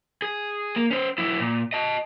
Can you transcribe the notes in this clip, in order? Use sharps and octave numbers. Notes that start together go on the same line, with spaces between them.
G#4
A#3
C#4 C5
F#3 E4
A#2
D#5 A5